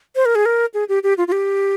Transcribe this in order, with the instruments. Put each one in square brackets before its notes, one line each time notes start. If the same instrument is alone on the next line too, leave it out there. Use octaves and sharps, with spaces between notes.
[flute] C5
A#4
G#4
A#4
G#4
G4
G4
F4
F4
G4